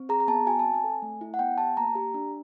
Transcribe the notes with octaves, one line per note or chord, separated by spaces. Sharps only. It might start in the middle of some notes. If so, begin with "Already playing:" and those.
Already playing: C4
G#4 A#5
A#5
B3 A5
F#4 G#5
A5
C4
G#5
A4
A3
E4
F#5
B3 G5
G4 A5
A#3 A#5
G4
D4